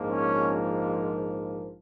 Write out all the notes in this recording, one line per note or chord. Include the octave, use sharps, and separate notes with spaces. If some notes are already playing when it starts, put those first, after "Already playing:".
Already playing: A#1 G#2 F3 A#3
C#4